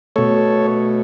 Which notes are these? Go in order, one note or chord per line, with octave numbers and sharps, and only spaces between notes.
B2 A3 A4 C#5